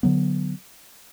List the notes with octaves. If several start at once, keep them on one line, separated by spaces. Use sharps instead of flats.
D3 F#3 B3